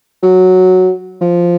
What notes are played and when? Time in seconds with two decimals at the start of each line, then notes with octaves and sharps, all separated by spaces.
0.23 F#3
1.21 F3